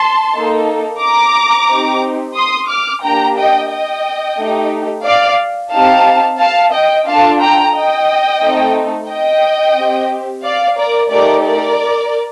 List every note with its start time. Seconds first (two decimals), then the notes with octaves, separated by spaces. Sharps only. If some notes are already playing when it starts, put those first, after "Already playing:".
Already playing: A5 C6
0.34 A#3 D#4 A4
1.01 A#5 D6
1.68 C4 D#4 G4
2.36 C6 D#6
2.69 D6 F6
3.03 A#3 D4 G4 G5 A#5
3.37 D#5 G5
3.70 D#5 G5
4.37 A3 D#4 G4
5.05 D5 F5
5.72 C4 D#4 G4 F5 A5
6.39 F5 A5
6.73 D#5 G5
7.07 D4 F4 A4 F5 A5
7.40 G5 A#5
7.74 D#5 G5
8.42 A3 C4 D#4 A4
9.09 D#5 G5
9.76 C4 G4
10.44 D5 F5
10.78 A#4 D5
11.10 A3 D#4 G4 A#4 D5
11.44 A#4 D5